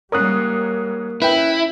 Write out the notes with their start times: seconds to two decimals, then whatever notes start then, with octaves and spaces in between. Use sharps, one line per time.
0.12 G#2 G3 A#3 C#4 A#4 D#6 F#6
1.22 C#4 E4 B4 G5